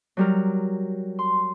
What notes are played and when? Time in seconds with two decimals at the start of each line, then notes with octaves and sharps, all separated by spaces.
0.17 F#3 G3 A#4
1.19 C6